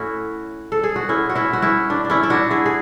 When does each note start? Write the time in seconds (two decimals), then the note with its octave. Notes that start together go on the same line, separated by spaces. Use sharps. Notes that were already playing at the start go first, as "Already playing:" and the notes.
Already playing: A2 C#4 E4 F#4
0.72 A4
0.84 G#4
0.96 F#4
1.09 C#4 E4
1.29 F#4
1.35 C#4 E4
1.53 F#4
1.62 C#4 E4
1.90 D4
2.04 D4
2.10 C#4 E4
2.23 E4
2.30 D4 F#4
2.51 E4 G#4
2.66 G#4